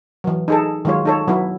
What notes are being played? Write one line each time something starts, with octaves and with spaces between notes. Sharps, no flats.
E3 F#3
D#4 G#4 A4
D#3 F#3 G#3 F4 C#5
D#4 A4 C#5
F#3 B3 E4